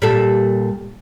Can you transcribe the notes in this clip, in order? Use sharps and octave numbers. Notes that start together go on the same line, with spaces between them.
A#2 G3 A4